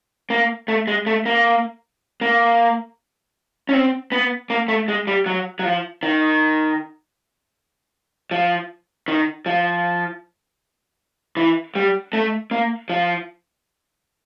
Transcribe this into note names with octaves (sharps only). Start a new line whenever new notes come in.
A#3
A3
G#3
A3
A#3
A#3
C#4
C4
B3
A#3
A3
G#3
G3
F#3
F#3
F3
D#3
F3
D#3
F3
E3
G3
A3
A#3
F3